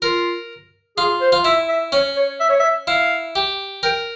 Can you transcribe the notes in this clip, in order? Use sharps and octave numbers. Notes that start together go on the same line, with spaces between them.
F4 A#4
F4 G#4
C5
F4
E4 E5
E5
C#4 C#5
C#5
E5
C#5
E5
E4 F5
G4
A#4 G5